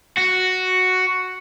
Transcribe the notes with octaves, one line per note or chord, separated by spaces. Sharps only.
F#4